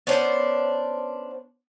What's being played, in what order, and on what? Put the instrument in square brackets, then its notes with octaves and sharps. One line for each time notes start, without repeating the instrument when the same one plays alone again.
[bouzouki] B3 C#4 D4 C5